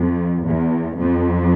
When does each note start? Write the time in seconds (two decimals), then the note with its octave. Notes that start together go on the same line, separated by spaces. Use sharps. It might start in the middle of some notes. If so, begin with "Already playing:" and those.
Already playing: F2
0.45 E2
0.97 F2